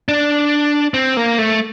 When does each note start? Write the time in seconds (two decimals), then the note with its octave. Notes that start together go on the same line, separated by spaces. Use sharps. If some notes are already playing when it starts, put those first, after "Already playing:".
0.08 D4
0.94 C4
1.17 A#3
1.38 A3